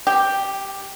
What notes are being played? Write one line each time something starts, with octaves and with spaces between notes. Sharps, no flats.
G4